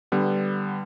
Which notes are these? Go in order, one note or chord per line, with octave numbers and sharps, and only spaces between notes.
D3 G3 B3